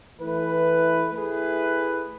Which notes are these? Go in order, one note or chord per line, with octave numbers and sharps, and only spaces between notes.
E3 A3 E4 B4
A3 E4 G#4 B4